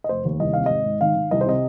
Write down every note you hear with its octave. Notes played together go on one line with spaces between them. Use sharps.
D#5
F1 C5
D#2
C2 D#5
C3 F5
G#1 D#5
G#2
D#3 F5
D#3
C2 D#5
C5
C3 D#5